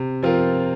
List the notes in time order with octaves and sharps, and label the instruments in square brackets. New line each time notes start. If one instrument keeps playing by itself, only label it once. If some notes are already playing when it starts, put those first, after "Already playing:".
Already playing: [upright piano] C3
F3 C4 F4 A#4